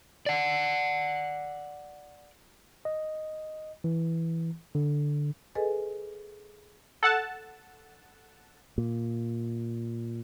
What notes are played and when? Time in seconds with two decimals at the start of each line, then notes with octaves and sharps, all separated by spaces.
0.26 D5 F#5
2.85 D#5
3.84 E3
4.75 D3
5.55 G#4 A4 B4 D#5 G#5
7.03 A4 F#5 A5
8.78 A#2